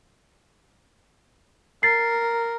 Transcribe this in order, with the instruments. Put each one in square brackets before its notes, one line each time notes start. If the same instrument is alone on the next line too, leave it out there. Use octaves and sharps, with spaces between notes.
[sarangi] A#4 [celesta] A6 C7